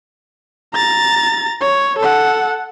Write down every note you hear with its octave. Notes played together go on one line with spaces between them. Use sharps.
A#5 A6
C#5
A4 F#5